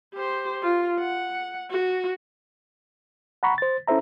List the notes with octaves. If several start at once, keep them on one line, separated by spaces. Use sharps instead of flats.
G4 C5
F4
F#5
F#4
F#5 A#5 B5 C#6
C5 A6
C#4 E4 A4 C5 E5 A#5